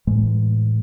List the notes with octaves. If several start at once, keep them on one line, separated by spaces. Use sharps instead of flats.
A2 E3 G#3